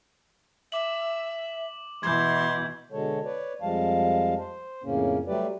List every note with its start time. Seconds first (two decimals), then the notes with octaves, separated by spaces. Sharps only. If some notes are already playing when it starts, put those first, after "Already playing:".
0.72 E5 D6 F#7
2.03 B2 E3 C6 G6 G#6
2.92 B2 D3 G#3 A4 C#5
3.24 B4 C#5 D5
3.62 F2 F3 G3 G#3 F5 A5
4.38 C5
4.84 F2 A2 C#3 A#3 C#4
5.27 F#3 G3 A3 G4 B4 D5